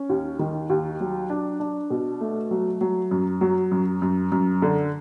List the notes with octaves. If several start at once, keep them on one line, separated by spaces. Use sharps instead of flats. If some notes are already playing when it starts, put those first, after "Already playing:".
Already playing: C#4
D#2
D#3
D#2
F#3
D4
D4
B2
A3
F#3
F#3
F#2
F#3
F#2
F#2
F#2
D3